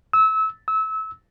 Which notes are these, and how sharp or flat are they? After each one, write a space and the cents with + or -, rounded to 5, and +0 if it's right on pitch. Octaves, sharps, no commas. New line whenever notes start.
E6 -25
E6 -25